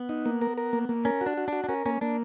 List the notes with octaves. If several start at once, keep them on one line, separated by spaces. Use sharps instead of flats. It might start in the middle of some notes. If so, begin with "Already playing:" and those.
Already playing: B3
D#4
A#3
A#4
A#4
A#3
A#3
C#4 A#4
F#4
D4
F#4
D4 F#4
D4
C#4 A#4
A#3 C#4
A#3 D4